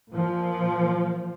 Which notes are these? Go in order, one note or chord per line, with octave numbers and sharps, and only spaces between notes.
A#2 F3